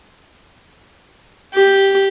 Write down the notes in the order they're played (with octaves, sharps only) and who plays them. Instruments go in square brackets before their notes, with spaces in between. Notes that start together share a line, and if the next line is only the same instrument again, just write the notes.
[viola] G4